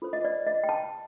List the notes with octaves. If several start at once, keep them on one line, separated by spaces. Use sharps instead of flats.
F4 A4 C5
D#5
D5
D#5
G5
A5